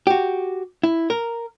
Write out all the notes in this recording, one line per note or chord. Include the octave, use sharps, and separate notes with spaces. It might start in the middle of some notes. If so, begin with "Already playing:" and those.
F#4 G4
E4
A#4